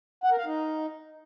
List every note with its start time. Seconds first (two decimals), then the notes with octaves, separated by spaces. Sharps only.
0.24 F#5
0.31 A#4
0.38 F5
0.46 D#4